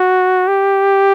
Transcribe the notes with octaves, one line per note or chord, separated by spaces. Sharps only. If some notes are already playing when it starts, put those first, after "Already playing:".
Already playing: F#4
G4